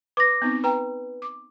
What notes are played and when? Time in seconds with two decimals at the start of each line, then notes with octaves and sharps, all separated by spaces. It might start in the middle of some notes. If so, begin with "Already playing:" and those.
0.17 B4 D6 A#6
0.42 B3 C4 D#4
0.64 B4 G5 A#5
1.22 D6